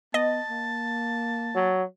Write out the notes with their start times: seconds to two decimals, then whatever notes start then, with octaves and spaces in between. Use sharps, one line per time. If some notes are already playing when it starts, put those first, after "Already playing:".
0.14 B3 D#5 A5
0.50 A#3
1.55 F#3